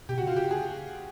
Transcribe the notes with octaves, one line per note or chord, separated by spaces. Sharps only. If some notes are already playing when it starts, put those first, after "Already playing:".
B2 G4
F#4
C#3 F4
G4
G#4